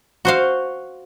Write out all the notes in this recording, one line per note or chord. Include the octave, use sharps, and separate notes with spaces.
F#4 C5 F5